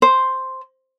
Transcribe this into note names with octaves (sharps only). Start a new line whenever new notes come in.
C5